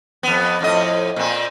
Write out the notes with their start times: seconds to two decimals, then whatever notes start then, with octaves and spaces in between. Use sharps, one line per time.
0.23 F2 B3
0.61 F2 A2 D#5
1.16 A#2 C4